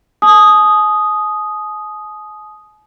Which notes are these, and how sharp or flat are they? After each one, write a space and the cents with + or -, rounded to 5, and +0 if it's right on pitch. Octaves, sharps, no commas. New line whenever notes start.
G#5 +45 D#6 +0